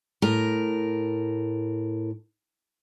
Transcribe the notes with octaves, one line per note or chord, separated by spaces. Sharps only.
A2 A#4